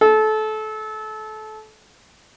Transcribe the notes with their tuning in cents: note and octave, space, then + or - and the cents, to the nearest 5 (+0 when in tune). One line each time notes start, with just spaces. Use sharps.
A4 -25